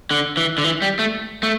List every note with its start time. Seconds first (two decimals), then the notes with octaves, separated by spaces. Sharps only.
0.11 D3
0.37 E3
0.58 D3
0.64 E3
0.82 G3
0.99 A3
1.43 A3